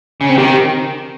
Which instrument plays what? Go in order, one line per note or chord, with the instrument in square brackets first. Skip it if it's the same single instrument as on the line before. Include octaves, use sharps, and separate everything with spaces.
[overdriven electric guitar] C#3 [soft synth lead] C#4
[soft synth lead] C4
[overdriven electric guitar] D#3 [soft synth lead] G4